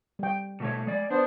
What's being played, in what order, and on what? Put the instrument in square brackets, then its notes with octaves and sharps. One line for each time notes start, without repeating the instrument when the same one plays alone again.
[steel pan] G3 G5
[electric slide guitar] B2 A3 C#5
G#3 D5
[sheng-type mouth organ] B3 C5 [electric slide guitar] D4